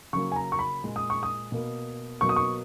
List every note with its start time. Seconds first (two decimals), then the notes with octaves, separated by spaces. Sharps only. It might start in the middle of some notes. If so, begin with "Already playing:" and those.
0.13 C#3 F#3 A#3 C#6
0.32 G#5
0.36 A#5
0.52 C#6
0.59 B5
0.83 A#2 G#3
0.96 D#6
1.10 C#6
1.23 D#6
1.52 B2 A#3
2.21 B2 F#3 A#3 C#6
2.29 D#6
2.36 C#6